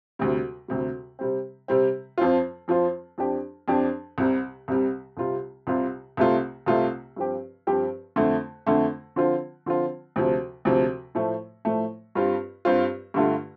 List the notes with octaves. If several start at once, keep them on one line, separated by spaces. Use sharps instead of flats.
D2 C3 G3
D2 C3 G3
C3 G3 C4
C3 G3 C4
F2 F3 C4 F4
F2 F3 C4 F4
F2 F3 D4 G4
F2 F3 D4 G4
C2 C3 G3
C2 C3 G3
C2 C3 G3 F4
C2 C3 G3 F4
C2 C3 A3 F4
C2 C3 A3 F4
G2 F3 C4 G4
G2 F3 C4 G4
F2 D3 A3
F2 D3 A3
D3 F3 C4 F4
D3 F3 C4 F4
D2 C3 F3
D2 C3 F3
A2 F3 A3
A2 F3 A3
G2 G3 C4 F4
G2 G3 C4 F4
G2 D3 A3 F4